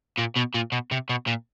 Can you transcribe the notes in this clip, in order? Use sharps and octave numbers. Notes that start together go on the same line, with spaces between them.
A#2
B2
A#2
B2
C3
B2
A#2